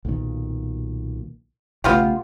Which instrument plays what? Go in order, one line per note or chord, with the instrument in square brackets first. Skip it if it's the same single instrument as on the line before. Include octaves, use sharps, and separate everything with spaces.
[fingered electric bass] B1 A#2 D#3
[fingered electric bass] B1 C#3 A3 [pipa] B3 F4 G4